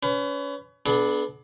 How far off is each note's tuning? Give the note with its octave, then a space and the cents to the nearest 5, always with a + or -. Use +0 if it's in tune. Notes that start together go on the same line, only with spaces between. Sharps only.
C#4 +35 B4 +30
B3 +0 D4 +0 G#4 +45